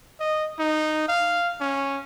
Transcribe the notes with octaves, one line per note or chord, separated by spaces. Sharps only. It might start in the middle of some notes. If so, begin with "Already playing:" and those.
D#5
D#4
F5
C#4